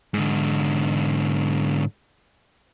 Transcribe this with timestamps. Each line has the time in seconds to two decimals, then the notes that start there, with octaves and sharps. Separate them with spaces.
0.14 G#2 D3